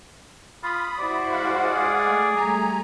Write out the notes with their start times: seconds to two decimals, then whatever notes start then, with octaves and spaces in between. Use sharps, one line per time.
0.63 F4 B5 D#6
0.99 E4 F#4 C5 D5
1.31 G#3 F5 F#5 B5
1.64 G#4
2.06 A3
2.36 G3 A3 G#5 A#5